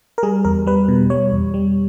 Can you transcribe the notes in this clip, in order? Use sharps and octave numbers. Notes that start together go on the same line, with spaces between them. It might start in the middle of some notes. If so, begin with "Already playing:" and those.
A#4
G3 G#4
E2 A#4
G3 B4
B2
G3 C#5
E2
G3